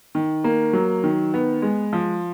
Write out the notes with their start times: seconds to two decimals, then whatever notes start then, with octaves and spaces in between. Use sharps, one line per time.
0.15 D#3
0.44 A#3
0.73 F#3
1.04 D#3
1.34 B3
1.62 G#3
1.93 F3